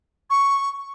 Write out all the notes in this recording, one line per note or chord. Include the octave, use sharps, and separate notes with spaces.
C#6